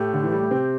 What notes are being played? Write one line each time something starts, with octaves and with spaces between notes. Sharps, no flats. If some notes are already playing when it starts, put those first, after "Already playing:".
Already playing: A2 A3 G4
D3
E3
G3
A3
C3 C4